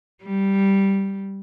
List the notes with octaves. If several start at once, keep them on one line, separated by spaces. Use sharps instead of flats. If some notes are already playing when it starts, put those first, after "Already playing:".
G3